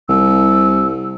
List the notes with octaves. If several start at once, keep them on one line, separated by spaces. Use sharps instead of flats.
C2 E6